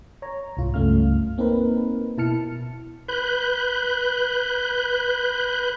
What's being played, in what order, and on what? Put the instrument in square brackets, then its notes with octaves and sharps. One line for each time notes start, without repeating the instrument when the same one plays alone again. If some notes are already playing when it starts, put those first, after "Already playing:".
[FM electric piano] C#5 A#5
C2 G#2 F4
C#2 G2 A3 C#4 F5 F6
A#3 C4 D#4 A#4 B4
B2 E4 A5 F6 C#7
[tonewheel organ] B4 F#6 G6